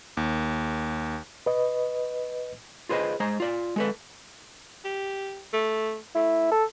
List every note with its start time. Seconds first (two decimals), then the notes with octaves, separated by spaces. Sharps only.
0.17 D#2
1.46 B4 D#5
2.89 F4 G#4 B4 C5 D#5
3.20 G#3 C5 A#5
3.40 F4 D5
3.76 G#3 A4 B4
4.85 G4
5.53 A3
6.15 A3 E4
6.51 A4